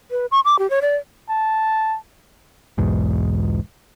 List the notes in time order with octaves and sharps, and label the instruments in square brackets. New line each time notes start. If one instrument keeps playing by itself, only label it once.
[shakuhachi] B4
C#6
D6
G4
C#5
D5
[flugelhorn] A5
[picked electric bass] B1 E2 G#2